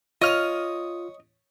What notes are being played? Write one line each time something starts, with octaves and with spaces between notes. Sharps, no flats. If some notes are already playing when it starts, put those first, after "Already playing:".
F4 C#5 D#5 D#6 F6